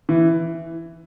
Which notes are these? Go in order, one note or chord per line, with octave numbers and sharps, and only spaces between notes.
E3